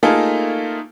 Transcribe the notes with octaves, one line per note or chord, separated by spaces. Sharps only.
A3 A#3 D#4 F4 G#4 A4